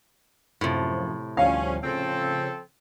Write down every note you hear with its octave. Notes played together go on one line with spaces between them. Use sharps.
F#2 A2 C3 F3
D2 F3 G3 C#4 F5
C#3 F3 C4 A4